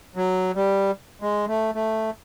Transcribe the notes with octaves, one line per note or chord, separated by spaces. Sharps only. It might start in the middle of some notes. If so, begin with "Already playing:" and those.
F#3
G3
G#3
A3
A3